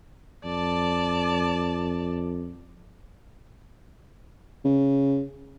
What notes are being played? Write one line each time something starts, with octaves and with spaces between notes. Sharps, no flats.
F2 D5 A5
C#3